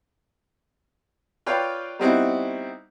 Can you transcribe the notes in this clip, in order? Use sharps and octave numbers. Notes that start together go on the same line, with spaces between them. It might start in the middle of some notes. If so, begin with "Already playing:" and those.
F4 B4 C#5 D5 F5 G5
G3 B3 C4 D#4 E4 F#4